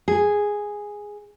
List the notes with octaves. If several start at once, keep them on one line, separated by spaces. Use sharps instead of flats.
G#4